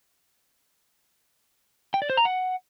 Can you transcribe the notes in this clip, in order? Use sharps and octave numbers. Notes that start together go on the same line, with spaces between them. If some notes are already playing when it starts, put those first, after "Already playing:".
G5
D5
C5
A#5
F#5